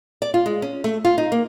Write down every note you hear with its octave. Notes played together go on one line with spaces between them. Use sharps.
D5
F4
G#3
C#4
A3
F4
D#4
A#3